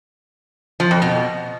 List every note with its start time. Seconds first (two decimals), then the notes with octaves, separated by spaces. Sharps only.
0.80 F3
0.91 F2
1.02 B2